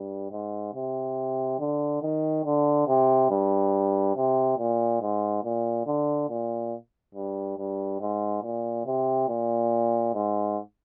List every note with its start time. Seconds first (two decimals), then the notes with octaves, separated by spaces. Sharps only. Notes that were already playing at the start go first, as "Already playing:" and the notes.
Already playing: G2
0.31 G#2
0.74 C3
1.59 D3
2.02 D#3
2.45 D3
2.88 C3
3.30 G2
4.16 C3
4.58 A#2
5.01 G#2
5.44 A#2
5.87 D3
6.29 A#2
7.14 G2
7.57 G2
8.00 G#2
8.43 A#2
8.86 C3
9.28 A#2
10.14 G#2